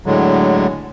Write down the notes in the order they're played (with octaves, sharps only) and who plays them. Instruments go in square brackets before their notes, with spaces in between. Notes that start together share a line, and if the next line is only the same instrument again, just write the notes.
[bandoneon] A2 D3 F#3 G#3